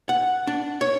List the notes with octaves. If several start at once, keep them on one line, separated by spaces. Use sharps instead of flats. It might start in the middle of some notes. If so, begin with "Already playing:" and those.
F#5
D4
C#5